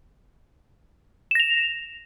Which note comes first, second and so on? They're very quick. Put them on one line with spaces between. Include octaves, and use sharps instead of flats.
E7 A#6 F7